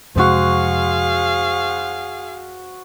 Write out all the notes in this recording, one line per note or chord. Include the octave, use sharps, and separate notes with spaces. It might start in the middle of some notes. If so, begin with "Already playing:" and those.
F2 C3 G#3 F#4 G#4 C5 F5